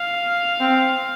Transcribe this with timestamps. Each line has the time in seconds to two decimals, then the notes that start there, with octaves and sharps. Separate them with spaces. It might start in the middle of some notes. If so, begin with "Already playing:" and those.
Already playing: F5
0.61 C4